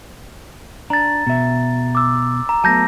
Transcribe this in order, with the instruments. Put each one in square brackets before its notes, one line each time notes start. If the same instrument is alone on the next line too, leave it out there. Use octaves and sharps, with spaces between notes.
[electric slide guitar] D4 [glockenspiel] A#5 A6
[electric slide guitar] B2 E5
[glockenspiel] D6 E6
A#5
[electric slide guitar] F#3 A3 B3 [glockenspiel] A5 G6 A#6